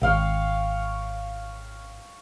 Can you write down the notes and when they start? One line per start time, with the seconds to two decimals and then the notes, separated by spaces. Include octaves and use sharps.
0.01 G#1 C#5 F5 G5